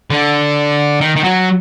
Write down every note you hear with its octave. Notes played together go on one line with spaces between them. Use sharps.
D3
D#3
D#3
F#3